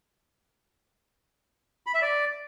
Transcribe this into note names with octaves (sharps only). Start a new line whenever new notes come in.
B5
E5
D5